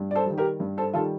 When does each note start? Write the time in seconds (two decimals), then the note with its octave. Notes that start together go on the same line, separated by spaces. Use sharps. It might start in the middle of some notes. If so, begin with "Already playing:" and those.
Already playing: G2
0.11 D5
0.15 A4 C5
0.26 D#3 G3
0.38 G4 A#4
0.60 G2
0.78 A4 C5
0.94 D#3 G3 F4 A4